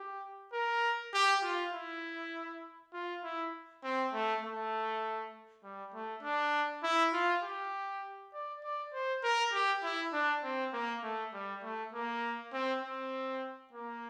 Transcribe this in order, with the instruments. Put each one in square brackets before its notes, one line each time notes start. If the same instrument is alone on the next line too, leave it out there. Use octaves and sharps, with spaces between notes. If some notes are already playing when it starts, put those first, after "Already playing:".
Already playing: [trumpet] G4
A#4
G4
F4
E4
F4
E4
C4
A3
A3
G3
A3
D4
E4
F4
G4
D5
D5
C5
A#4
G4
E4
D4
C4
A#3
A3
G3
A3
A#3
C4
C4
A#3